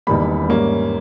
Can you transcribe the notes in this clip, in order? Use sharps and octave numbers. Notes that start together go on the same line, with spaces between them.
E1 E2 D#3 G3 A#3 B5
G#2 G3 A#3 C#4